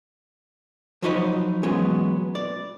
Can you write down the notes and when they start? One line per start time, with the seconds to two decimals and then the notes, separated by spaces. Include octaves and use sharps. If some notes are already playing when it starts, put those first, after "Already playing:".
1.02 F3 F#3 D#4 C#5 D#5 B5
1.63 E3 F#3 G#3 B3 C#4
2.35 D5